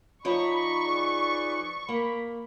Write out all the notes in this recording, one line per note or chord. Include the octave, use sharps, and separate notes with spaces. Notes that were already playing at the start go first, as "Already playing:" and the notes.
F3 D#4 C#5 D5 A#5 B5 C#6
G#4 B4 D5
A#3 B5